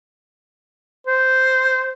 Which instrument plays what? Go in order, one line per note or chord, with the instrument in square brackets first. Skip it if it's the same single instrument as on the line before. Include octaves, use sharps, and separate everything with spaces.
[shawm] C5